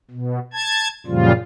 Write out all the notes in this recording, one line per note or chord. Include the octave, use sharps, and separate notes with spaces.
B2
A5 G#6
F#2 A#2 C#3 F3 G3 F4